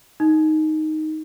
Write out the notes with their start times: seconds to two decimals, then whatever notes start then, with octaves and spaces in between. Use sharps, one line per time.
0.20 D#4